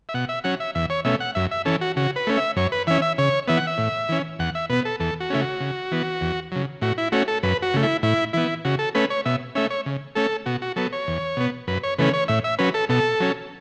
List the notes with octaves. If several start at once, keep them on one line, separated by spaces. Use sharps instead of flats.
E5
B2 F#5
E5
F#3 C#4 F#5
E5
E2 E5
C#5
B2 A3 C#4 E5
F#5
F#2 E5
E5
E3 C#4 A4
F#4
C#3 F#4
B4
A3 C#4
E5
F#2 C#5
B4
E3 C#4 E5
E5
C#3 C#5
E3 B3 E5
F#5
E5
A2
E3 C#4
E2 F#5
E5
B2 B3 B4
A4
E2 A4
F#4
C#3 A3 C#4 E4
F#4
C#3
E3 B3
E2
C#3 F#3
A2 F#4
E4
A3 C#4 F#4
A4
F#2 B4
F#4
C#3 A3
E4
A2 E4
E3 B3 E4
C#3 F#4
A4
A3 C#4 B4
C#5
B2 E5
A3 C#4 E5
C#5
C#3
A3 C#4 A4
B2 F#4
F#4
F#3 B3 A4
C#5
E2
B2 B3
F#2 B4
C#5
C#3 E3 A3 C#4 B4
C#5
A2 E5
E5
F#3 C#4 B4
A4
B2 A4
F#3 C#4